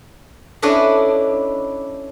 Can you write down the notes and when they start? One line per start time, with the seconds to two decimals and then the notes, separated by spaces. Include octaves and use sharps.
0.62 C#4 D4 E4 A4 B4 D#5